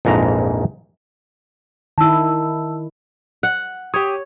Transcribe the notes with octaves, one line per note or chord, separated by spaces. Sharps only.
A#1 F2 G#2 E3 A#5
D#3 E4 A5 E6
F#5
G4 C#5 D#6